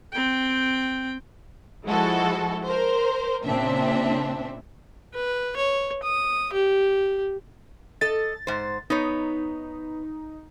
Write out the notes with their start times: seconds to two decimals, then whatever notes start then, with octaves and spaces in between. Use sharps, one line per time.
0.13 C4 G5
1.86 F3 G#3 E4 F#4 A4
2.66 A#4 C5
3.45 A#2 C#3 C4 D4 E5
5.14 B4
5.57 C#5
6.03 D#6
6.53 G4
8.01 A4 D#5 A6
8.47 G#2 C5
8.90 B3 D#4 C#5